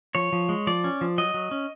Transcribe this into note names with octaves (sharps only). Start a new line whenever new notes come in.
F3 C#5
F3
G#3
F3 D5
C#4
F3
F#3 D#5
F#3
C#4